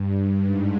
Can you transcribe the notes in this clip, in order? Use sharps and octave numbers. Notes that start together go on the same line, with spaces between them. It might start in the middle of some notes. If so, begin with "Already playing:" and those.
Already playing: G2
G2
G#2